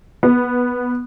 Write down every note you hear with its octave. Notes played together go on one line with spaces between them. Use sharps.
B3